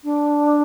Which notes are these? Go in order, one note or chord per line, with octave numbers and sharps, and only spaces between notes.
D4